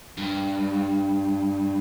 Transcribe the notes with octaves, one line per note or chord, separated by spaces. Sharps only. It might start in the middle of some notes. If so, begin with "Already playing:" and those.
G2